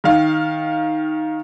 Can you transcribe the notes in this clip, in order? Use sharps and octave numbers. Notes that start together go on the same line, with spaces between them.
D#3 F5